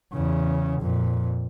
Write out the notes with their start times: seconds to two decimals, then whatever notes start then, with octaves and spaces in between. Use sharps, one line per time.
0.13 E2 C#3
0.81 F2 A#2